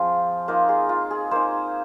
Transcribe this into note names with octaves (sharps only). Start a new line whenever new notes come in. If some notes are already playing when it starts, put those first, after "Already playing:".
Already playing: F3 C4 F4 G#4
A#3 D#4 F4
G#4
F4
G#4
A#3 D#4 C5